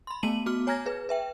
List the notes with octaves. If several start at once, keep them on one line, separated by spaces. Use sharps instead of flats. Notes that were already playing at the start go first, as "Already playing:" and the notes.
B5 C6
A3 B3 A5 D#7 F#7
B3 F#4 D6 F6
C#5 G#5 A#5 F6 G#6 A#6
G#4 B4
B4 E5 G5